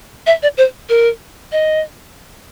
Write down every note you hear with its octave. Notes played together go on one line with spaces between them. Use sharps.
E5
D5
C5
A#4
D#5